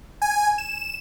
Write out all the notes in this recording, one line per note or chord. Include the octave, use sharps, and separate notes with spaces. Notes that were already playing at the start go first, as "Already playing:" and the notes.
G#5
E7